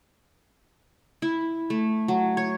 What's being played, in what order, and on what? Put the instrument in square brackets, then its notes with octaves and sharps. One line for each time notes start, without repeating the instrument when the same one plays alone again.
[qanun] E4
A3
F#3
C#5